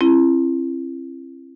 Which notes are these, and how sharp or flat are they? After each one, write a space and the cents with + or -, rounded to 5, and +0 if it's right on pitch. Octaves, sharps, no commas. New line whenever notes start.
C4 +45 E4 +35